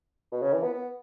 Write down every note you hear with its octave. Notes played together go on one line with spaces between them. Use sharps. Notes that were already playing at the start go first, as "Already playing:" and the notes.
B2
C#3
E3
B3
B3